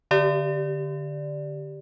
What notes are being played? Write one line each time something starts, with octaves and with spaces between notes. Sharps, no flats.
D3 G4 D5